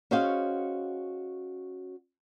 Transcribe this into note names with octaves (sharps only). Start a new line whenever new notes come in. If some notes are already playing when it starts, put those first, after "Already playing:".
C#4 F#4 G#4 C5 D#5 F5